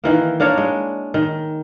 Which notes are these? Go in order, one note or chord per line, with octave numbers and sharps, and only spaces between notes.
D#3 E3 A#3
A#3 D4 A#4 C#5
G#3
D#3